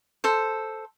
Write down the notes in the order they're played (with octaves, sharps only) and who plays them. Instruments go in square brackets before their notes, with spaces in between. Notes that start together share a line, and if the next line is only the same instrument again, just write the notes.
[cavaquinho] A4 C5